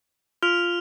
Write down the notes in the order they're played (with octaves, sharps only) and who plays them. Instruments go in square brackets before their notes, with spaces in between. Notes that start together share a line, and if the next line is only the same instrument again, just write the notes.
[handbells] F4 [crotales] F6 F7